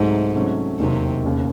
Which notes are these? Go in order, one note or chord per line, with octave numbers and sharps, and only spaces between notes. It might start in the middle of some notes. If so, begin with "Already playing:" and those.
Already playing: C2 G#2 C3 F#3 A3
C3 F#3 A3 C#4
E1 D#2 C3 D#3 F#3
E1 D#2 C#3